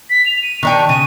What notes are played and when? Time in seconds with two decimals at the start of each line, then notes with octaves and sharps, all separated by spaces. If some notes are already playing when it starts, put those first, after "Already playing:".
0.10 B6
0.26 F7
0.42 D#7
0.63 D#3 D4 G4 C#6
0.89 C#3 D#7